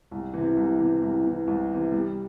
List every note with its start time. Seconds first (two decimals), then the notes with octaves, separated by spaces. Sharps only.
0.11 C2
0.34 C3 E3
0.57 C2
0.79 C3 E3
1.02 C2
1.24 C3 E3
1.47 C2
1.70 C3 E3
1.92 G3